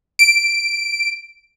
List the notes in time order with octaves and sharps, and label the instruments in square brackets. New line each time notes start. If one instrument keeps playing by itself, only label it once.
[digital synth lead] D7